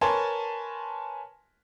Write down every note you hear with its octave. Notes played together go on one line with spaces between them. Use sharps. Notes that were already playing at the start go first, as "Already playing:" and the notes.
A#4 B4 C#5 G#5 A5 C6